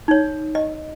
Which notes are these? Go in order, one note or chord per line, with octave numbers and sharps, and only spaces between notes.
D#4 C#5
D#5